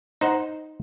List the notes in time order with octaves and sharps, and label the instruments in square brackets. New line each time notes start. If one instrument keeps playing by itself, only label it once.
[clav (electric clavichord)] D#4 C5 F#5